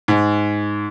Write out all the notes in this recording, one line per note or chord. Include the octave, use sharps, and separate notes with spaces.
G#2